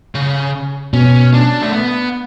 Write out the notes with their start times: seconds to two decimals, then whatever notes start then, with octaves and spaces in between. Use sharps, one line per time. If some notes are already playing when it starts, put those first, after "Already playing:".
0.15 C#3
0.93 B2 C#4
1.34 D4
1.62 A3
1.73 B3